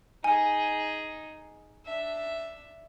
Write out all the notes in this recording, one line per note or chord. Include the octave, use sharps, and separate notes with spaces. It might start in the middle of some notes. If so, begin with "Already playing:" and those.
D#4 G#4 G#5
D4 E5